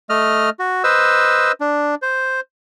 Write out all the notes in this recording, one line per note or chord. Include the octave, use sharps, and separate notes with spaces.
A3 D#5 F6
F#4
B4 C5 D#5 E6
D4
C5